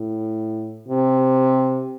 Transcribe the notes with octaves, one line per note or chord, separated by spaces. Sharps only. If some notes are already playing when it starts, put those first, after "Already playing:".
Already playing: A2
C3